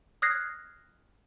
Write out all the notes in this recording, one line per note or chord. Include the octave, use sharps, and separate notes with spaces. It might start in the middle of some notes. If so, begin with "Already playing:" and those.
D#6 F6 F#6 G#6 A#6 C7